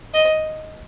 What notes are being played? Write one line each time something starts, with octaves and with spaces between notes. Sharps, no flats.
D#5